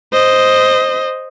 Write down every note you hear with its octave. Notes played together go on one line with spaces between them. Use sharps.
C5 D#5